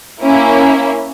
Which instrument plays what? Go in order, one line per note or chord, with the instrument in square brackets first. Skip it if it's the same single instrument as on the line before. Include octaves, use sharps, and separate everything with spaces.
[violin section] A#3 C#4 E4